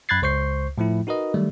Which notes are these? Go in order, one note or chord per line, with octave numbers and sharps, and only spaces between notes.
F#2 B5 F#6 G#6 A6 C7
C#2 C5 C#6 G6 C7
A2 F3 A3 E4
D#4 F#4 A#4 B4 D#5
D#3 F#3 G3 A3